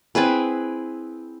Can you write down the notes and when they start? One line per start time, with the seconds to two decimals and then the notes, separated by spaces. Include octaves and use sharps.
0.15 C4 E4 G#4 B4